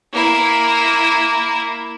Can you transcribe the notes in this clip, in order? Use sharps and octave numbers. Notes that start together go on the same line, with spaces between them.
A#3 E4